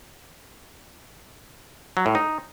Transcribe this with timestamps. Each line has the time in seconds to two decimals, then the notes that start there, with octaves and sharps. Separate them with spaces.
1.97 F#3
2.06 A2
2.15 D#4